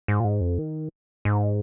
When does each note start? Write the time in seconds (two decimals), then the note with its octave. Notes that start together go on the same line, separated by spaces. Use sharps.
0.08 G#2
0.20 A#2
0.24 G#2
0.41 F2
0.58 D#3
1.25 G#2